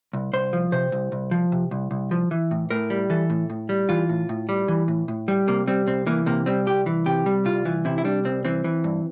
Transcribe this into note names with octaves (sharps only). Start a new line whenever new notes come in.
C2
C2 C5
F3
C3 C5
C2
C2
F3
C3
C2
C2
F3
E3
A2
A2 A#4
G3
E3 A4
A2
A2
G3
E3 F4
A2
A2
G3
E3
A2
A2
G3
C3 A#3
G3 C4
C2 C4
E3 A#3
C3 A#3
G3 C4
C2 G4
E3
C3 G4
G3
C2 F4
E3
C3 E4
E4
G3 D4
C2 C4
E3 C4
E3
G2